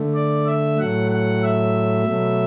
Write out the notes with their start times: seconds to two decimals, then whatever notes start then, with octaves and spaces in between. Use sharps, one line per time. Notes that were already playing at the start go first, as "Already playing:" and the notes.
Already playing: D3 A3
0.14 D5
0.46 E5
0.78 A2 F#3 A3 F#5
1.11 F#5
1.43 E5
2.06 B2 F#3 A3